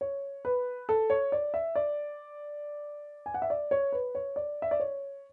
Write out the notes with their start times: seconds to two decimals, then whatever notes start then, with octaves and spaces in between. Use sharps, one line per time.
0.01 C#5
0.45 B4
0.89 A4
1.10 C#5
1.32 D5
1.54 E5
1.76 D5
3.26 G#5
3.34 F#5
3.42 E5
3.50 D5
3.71 C#5
3.92 B4
4.15 C#5
4.36 D5
4.62 E5
4.71 D5
4.80 C#5